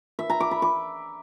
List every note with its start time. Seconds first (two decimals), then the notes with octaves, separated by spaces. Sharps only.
0.19 E5
0.30 A#5
0.40 D6
0.51 B5
0.62 D6